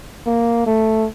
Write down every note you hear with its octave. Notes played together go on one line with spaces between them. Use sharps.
A#3
A3